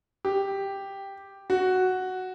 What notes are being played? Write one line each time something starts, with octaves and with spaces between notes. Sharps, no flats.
G4
F#4